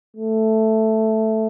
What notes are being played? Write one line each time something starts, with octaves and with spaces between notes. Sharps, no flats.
A3